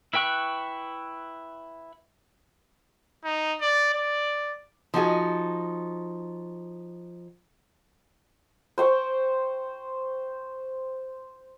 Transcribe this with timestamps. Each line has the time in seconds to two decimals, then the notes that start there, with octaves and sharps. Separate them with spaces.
0.13 E4 B4 G5 C#6 F#6
3.25 D#4
3.61 D5
3.95 D5
4.94 F3 D#4 F#4 G#4
8.78 C5 G5 C#6